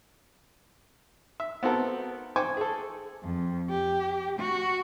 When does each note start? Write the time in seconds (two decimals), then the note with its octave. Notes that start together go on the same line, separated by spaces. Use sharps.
1.40 E5
1.63 B3 C4 F#4 A4 A#4
2.36 C5 G5 G#5 C#6 D6
2.57 G#4 A4
3.23 F2
3.70 G4
4.39 F#4